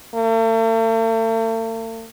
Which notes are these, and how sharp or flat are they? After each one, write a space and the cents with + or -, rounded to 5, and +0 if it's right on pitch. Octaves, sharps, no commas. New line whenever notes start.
A3 +45